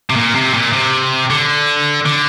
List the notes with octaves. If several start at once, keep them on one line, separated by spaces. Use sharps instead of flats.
C3
A#2
C3
A#2
C3
D3
D3